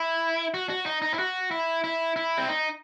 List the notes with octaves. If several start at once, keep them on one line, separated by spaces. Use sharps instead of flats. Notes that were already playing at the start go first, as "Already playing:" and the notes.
Already playing: E4
F#4
F#4
D#4
D#4
E4
F#4
E4
E4
E4
C4
D#4